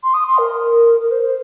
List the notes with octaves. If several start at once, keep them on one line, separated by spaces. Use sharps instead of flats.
C6
D#6
C6
A#4
A#4
C5
C5